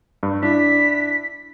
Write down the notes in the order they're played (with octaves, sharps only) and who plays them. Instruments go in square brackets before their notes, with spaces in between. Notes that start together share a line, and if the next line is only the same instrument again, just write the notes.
[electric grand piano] G2
[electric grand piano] D4 E4 [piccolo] B6